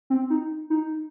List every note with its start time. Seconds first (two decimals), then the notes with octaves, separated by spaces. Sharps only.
0.10 C4
0.30 D#4
0.70 D#4